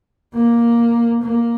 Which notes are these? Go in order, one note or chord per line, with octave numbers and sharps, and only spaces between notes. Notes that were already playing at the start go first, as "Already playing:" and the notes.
A#3
A#3